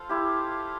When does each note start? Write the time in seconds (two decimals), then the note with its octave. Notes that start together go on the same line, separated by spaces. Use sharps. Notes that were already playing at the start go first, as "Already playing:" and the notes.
Already playing: F4 A4 C5 F5
0.09 E4 G4